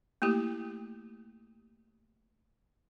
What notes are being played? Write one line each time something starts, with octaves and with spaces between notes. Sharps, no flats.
A3 A#3 E4 G4